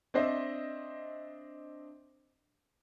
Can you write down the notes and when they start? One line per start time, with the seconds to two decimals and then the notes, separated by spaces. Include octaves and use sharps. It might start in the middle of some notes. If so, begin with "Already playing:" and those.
0.14 C4 D4 C5 D#5 E5